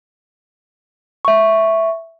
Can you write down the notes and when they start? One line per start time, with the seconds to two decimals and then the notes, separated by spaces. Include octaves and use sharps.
1.25 E5 C#6